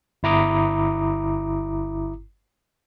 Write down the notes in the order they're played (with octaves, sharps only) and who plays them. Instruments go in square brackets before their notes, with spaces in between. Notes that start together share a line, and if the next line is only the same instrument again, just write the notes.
[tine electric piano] G1 E4 A#5 D6 D#6